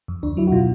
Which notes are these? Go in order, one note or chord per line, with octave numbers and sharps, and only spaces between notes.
F2
D2 D4
F#3 E4
F#4
B2 F4